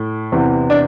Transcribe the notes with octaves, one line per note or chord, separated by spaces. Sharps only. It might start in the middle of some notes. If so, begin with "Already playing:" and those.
Already playing: A2
E2 C3 E3
D4